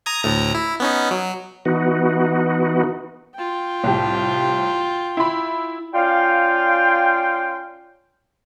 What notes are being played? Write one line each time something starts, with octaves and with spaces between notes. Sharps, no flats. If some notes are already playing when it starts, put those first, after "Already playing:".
A#5 D#6 G#6
D2 A2 A#5
E4
B3 C#4 D#4
F#3
E3 B3 D#4 F#4
F4 G5
C2 A2 G4
E4 B5
C#4 F4 D5 F5 G5